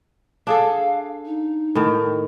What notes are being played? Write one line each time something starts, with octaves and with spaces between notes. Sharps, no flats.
D4 G#4 A4 F5
D#4
A2 D#3